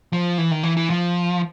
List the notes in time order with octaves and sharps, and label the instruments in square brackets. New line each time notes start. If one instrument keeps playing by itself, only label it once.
[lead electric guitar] F3
E3
D#3
E3
E3
F3